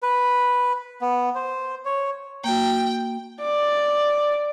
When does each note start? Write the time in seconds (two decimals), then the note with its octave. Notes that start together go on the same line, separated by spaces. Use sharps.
0.03 B4
1.01 B3
1.35 C5
1.85 C#5
2.44 A#3 F#4 G5
3.43 D5